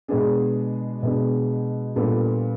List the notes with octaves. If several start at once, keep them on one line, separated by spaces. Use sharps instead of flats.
B2 G#3 B3 D4 G#4
B2 G#3 B3 D4
A#2 G3 B3 D4 A4